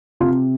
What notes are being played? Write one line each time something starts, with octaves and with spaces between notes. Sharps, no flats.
C3 F4